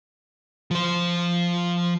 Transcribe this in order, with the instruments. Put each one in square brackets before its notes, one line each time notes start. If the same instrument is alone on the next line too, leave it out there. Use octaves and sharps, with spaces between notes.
[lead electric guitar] F3 C5